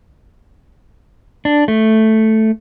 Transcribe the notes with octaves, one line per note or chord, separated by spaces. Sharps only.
D4
A3